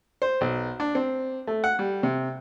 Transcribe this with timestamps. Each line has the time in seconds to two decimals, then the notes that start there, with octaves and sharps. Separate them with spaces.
0.22 C5
0.41 B1
0.80 D4
0.95 C4
1.47 A3
1.64 F#5
1.79 G3
2.03 C3